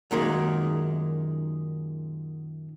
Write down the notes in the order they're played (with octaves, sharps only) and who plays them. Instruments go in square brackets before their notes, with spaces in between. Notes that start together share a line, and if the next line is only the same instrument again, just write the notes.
[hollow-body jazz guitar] F#2 A#2 D#3 G#3